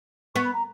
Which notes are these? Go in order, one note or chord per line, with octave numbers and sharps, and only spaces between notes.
B3 C#6
B5
A#5